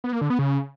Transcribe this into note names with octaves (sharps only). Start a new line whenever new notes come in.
B3
A#3
D3
B3
C#3